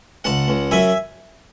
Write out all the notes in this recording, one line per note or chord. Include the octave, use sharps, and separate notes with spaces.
C#2 F#5 A5
C#2
F#2 E5 G#5